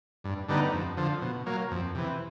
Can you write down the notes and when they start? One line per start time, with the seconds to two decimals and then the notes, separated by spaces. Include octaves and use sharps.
0.24 G2
0.49 D3 G3 B3 D#4
0.73 F2
0.97 D3 F3
1.22 B2
1.46 F#3 A#3
1.71 F2
1.95 C3 E3